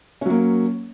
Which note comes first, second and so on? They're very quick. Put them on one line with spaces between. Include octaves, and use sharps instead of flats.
C#4 F#3 A#3